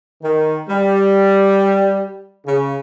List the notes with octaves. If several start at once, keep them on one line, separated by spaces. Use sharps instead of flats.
D#3
G3
C#3